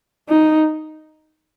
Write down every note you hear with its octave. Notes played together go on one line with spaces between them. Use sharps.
D#4